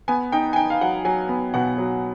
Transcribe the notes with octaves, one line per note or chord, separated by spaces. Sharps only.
B3 G#5
D#4 G5
G#5
D#4 G5
F5
F#3 F#5
F#3 G#5
B3
B2 F#5
F#3